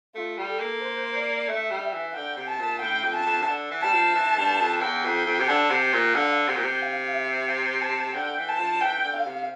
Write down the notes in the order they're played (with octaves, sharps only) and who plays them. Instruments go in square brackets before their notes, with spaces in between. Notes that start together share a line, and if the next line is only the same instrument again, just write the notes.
[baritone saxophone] A3 [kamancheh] F4
[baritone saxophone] G3
[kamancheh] A4
[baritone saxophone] A#3
[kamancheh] C5
D5
[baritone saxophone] A3 [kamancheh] E5
[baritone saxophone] G3
[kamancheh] E5
[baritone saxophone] E3
[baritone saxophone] D3 [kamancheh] G5
[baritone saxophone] C3
[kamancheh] A5
[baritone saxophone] A#2
[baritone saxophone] A2 [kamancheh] G5
[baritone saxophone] F2
[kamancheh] A5
[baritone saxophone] F2
E3
D3
E3
[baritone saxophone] G3 [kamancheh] A5
[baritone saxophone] F3
E3
G2
F2
[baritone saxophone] E2 [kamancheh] G5
[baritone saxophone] F2
[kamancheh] G5
[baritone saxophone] F2
C3
[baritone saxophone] D3 [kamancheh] A5
[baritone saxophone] C3
[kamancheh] G5
[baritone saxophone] A#2
[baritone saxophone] D3 [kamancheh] F5
[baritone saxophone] C3 [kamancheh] G5
[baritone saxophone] A#2
C3
[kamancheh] F5
E5
G5
A5
[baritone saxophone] D3 [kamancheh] G5
[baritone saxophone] E3
[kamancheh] A5
[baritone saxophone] F3
[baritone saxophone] E3 [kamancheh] G5
[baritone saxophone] D3
[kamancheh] F5
[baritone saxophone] C3